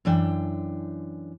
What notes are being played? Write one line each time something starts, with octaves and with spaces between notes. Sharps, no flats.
F#2 E3 D4 G5